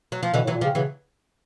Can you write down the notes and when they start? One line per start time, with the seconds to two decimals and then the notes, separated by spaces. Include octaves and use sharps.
0.12 F#3
0.23 F3
0.34 B2 D3 E3
0.44 A2
0.47 E3 F#3
0.55 A#2
0.61 F3 G3
0.64 C#3
0.75 C#3 E3 F#3